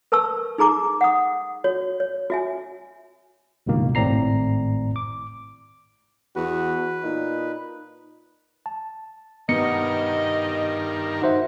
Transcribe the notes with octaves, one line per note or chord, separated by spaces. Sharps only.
A#4 B4 A5 C#6 E6
D#4 G#4 A#5 D6
F#5 D#6
F#4 C#5
C#5
F#4 E5 G#5
C#2 G2 B2 D#3 A#3
G#1 A2 C4 D5 A#5 C7
D6
E2 F#4 B4
A#2 D#4
A5
G2 D#3 B3 A#4 D#5 C#7
D#4 F#4 C5 E5